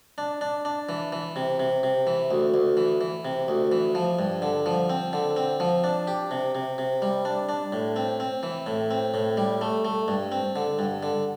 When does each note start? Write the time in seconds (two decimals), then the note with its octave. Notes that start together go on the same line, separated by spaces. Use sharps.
0.18 D4
0.41 D4
0.65 D4
0.89 E3
1.12 E3
1.36 C3
1.60 C3
1.83 C3
2.07 E3
2.31 D2
2.54 D2
2.77 E3
3.01 E3
3.25 C3
3.48 D2
3.72 E3
3.95 F3
4.19 G2
4.42 D3
4.66 F3
4.90 C4
5.13 D3
5.36 C4
5.60 F3
5.84 D4
6.07 G4
6.31 C3
6.55 C3
6.78 C3
7.02 G3
7.25 D4
7.49 D4
7.72 A2
7.96 C4
8.20 C4
8.43 E3
8.67 A2
8.91 C4
9.14 A2
9.37 G3
9.61 A3
9.85 A3
10.08 G2
10.32 C4
10.56 D3
10.79 G2
11.03 D3